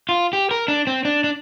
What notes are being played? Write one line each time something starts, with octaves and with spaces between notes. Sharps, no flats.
F4
G4
A#4
D4
C4
D4
D4